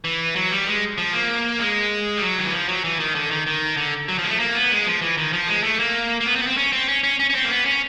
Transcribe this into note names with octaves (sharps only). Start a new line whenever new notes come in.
E3
F#3
G3
G#3
F3
A#3
G#3
G3
F#3
D#3
E3
F3
F#3
E3
D#3
D3
D#3
D#3
D3
F#3
F3
G#3
A3
A#3
B3
G#3
F3
E3
D#3
F3
G#3
A3
A#3
A#3
B3
C4
B3
C4
C#4
C4
C#4
C#4
C#4
C#4
C4
A#3
B3
C#4